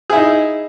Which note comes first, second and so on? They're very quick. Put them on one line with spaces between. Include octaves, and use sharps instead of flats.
G#4 E4 D#4